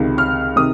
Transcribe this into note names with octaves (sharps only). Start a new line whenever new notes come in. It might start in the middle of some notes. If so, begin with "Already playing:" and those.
Already playing: C#2 C3 D#3
F6
C3 D#3 D#6